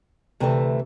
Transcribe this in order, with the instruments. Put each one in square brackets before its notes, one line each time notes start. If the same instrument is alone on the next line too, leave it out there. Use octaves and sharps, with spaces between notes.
[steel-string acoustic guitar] D2 C3 E3 A3